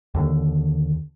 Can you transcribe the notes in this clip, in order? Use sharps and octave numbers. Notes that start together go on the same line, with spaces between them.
D#2 D3